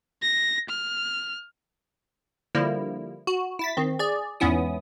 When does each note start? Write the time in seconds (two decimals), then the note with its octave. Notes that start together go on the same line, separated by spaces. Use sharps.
0.22 A#6
0.69 F6
2.55 D3 F3 G3 A#3 E4
3.27 F#4
3.59 E4 A6 B6
3.77 D#3 C4
3.99 G#4 D5
4.40 E2 G#2 B3 C#4 E4 D#6